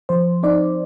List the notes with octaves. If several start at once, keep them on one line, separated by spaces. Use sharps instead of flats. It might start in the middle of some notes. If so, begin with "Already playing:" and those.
F3 C5
C4 D#4 D5